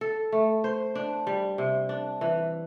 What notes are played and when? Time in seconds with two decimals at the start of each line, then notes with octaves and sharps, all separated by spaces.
0.01 A4
0.32 A3
0.64 C5
0.95 D4
1.27 G3
1.58 C3
1.89 D4
2.21 E3